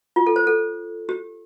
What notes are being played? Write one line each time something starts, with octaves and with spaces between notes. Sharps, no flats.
F4
A4
C5
A4
G4